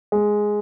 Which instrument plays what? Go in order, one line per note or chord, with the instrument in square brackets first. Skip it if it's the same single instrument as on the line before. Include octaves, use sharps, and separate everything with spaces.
[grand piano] G#3